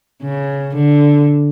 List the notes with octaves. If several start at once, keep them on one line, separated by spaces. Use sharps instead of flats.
C#3
D3